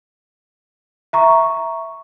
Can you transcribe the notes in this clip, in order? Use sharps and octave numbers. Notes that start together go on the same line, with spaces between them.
E5 A#5 C#6